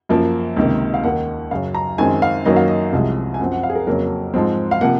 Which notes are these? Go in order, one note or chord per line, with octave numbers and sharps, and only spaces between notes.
F#2 F3 A#3
C#2 C3 D#3 A#3
F5
D#2 D#3 A#3 F#5
F#2 C#3 F#3 F5
A#5
F#2 D#3 G#3 C4 G#5
F5
F#2 D#3 F#3 A#3 D#5
F5
D#5
C2 C3 F3 G#3
G#5
F#2 F3 C4 F#5
F#5
F5
G#4
A#4
F2 C#3 F#3 A#3 A#4
G#2 F3 G#3 C4
F5
C3 F3 A#3 F#5